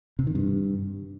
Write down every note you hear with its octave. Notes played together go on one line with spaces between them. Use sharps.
C3
D#3
G2